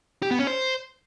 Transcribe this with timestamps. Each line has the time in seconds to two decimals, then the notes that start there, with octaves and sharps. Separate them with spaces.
0.23 G4
0.31 B3
0.39 C#4
0.47 C5